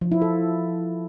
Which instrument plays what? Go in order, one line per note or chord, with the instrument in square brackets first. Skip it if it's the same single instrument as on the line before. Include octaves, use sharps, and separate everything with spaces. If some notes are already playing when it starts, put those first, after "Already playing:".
[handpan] F3
E4
A4